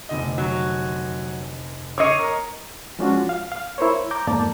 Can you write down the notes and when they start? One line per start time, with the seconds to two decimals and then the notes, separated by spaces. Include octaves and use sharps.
0.09 F1 D3 D#5
0.38 F#3
1.98 C#5 D#5 D6 C7 C#7
2.19 A#4
2.99 F3 G#3 C#4 D4 F4 F#4
3.29 F5
3.52 F5
3.78 E4 A#4 C5 C#5
4.11 A#5 D6 G6
4.27 F2 G#2 A#3 A#4 D5 A5